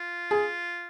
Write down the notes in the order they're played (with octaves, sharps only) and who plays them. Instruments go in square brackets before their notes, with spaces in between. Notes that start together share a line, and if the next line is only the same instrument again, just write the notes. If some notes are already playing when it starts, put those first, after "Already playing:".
Already playing: [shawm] F4
[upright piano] G#4